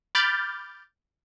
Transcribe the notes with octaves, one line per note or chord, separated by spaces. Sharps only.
B5 D6 F6 G6 A6